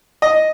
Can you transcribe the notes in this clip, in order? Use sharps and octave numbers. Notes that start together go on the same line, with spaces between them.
D#5